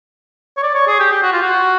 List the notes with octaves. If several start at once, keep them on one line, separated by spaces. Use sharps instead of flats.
C#5
D5
C#5
G#4
G4
G4
F#4
F4
F#4